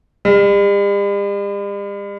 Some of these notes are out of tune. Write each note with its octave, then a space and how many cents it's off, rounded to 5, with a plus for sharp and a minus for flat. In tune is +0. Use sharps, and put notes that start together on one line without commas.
G3 +45